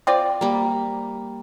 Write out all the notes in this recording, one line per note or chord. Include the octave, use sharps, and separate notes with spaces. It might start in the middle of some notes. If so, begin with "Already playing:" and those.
C4 F4 D5
G3 A#3